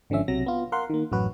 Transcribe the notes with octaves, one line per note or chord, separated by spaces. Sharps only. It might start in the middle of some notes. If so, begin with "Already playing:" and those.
G#1 D3 F3 C#4 E5
B1 C3 F#3 A#6
B3 F4
A#4 F5 F#5 C6
D#3 A#3
A1 F#2 F#3 F#4 B4